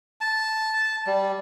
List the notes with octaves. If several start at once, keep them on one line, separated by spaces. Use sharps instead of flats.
A5
G3